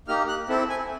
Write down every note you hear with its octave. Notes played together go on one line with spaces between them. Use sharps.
A#3 D#4 G4 F6
F#6
C4 E4 A4
G#5